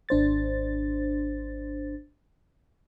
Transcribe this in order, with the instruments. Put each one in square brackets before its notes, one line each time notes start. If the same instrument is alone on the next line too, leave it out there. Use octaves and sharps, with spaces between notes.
[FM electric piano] G#1 D4 C5 A6